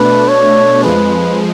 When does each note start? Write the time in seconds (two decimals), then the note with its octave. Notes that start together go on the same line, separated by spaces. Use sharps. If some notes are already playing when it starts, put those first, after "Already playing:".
Already playing: B2 A3 D4 B4
0.28 C#5
0.83 F2 F3 G#3 B4